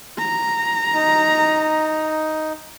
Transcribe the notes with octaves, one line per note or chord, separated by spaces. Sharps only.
A#5
D#4